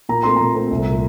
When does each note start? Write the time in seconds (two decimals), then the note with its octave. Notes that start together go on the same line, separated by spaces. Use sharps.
0.09 A#2 A#5
0.23 A3 C4 C6
0.36 A#2 A#5
0.55 A3 C4
0.71 C2
0.86 A#2 A3